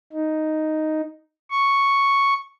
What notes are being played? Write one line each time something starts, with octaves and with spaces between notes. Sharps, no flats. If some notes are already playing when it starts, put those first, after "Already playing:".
D#4
C#6